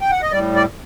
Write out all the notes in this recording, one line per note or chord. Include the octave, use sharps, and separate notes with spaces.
G5
F#5
D#5
A2 G3 D5
D5